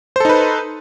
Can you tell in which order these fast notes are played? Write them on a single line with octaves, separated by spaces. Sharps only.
C5 A4 D#4 B4